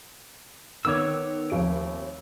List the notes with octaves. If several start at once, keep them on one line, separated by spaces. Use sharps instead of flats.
D#3 B3 C#5 D6 E6
F1 D#2 D7